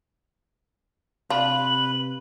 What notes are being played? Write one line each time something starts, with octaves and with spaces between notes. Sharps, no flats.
C3 D4 F4 B4 F#7